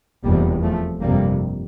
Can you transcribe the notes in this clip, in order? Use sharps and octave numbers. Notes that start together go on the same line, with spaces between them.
F1 E2 C3 G3 A#3
F3 A3
G1 F2 C3 G3 A#3